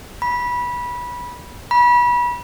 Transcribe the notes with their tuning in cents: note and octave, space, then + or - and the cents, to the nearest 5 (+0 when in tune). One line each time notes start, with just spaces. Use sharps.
B5 -20
B5 -30